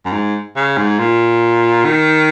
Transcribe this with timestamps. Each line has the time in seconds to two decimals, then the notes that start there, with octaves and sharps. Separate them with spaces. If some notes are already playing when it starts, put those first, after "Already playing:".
0.06 F#2
0.13 G#2
0.56 C#3
0.77 G#2
0.99 A#2
1.85 D#3